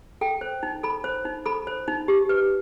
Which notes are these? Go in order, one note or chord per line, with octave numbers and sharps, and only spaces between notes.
A4 G5
C5
D#4
A4 B5
C5
D#4
A4 B5
C5
D#4
G4
B4